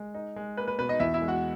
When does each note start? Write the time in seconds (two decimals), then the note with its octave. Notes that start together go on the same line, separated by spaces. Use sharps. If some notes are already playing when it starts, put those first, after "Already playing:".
Already playing: G#3
0.14 D#4
0.36 G#3
0.57 A#3 B4
0.68 B4
0.78 B2 B4
0.89 D#4 D#5
0.99 E2 E4 E5
1.14 E4 E5
1.22 G#3
1.28 F#4 F#5